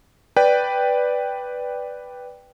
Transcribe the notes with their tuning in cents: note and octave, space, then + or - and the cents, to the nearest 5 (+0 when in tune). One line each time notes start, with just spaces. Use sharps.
B4 +0 D5 +0 G5 +0